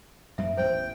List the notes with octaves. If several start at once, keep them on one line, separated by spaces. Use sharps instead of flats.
F#2 F3 A#3 E5
A1 E2 A#2 C5 G5